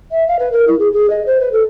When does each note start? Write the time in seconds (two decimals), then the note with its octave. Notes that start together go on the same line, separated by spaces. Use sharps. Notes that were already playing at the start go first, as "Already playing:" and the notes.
0.11 E5
0.28 F5
0.39 B4
0.52 A#4
0.67 E4
0.79 G#4
0.93 G#4
1.10 D#5
1.26 C5
1.40 B4
1.52 A4